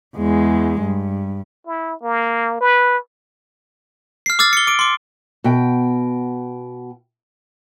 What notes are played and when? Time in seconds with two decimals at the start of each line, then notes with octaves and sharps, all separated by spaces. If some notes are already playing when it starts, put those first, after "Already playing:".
0.17 E2 G#3
0.81 G2
1.66 E4
2.02 A#3
2.60 B4
4.26 F6 C7
4.39 D6 E6 F6 A6
4.53 C#7 G7
4.67 D6 D7
4.79 C6 D6
5.44 B2 G5